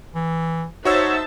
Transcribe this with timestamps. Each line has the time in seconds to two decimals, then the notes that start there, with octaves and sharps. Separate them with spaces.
0.15 E3
0.85 D#4 F#4 C5 C#5 E5 A5 E6